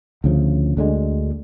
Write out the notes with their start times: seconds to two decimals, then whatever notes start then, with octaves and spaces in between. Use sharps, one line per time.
0.24 D2 C#3 F3
0.77 D2 D3 F3 G#3